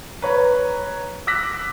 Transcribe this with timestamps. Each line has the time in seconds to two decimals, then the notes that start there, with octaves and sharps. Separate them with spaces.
0.22 B4 C#5 A#5
1.27 D6 E6 F#6 A#6 B6